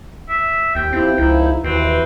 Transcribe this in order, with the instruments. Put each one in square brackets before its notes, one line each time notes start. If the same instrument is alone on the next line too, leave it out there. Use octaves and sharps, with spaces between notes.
[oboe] E5
[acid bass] D#2 [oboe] G5
[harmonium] F3 E4 G4 [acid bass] C4
[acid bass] C#2 [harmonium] F3 D#4 E4
[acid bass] D#2 [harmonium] E3 F#4 B4 [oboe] C4